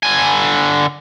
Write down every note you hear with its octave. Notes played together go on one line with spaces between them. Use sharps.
D3 G#5